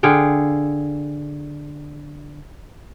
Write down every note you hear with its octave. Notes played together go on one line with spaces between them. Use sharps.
D3 G#4 F5 G5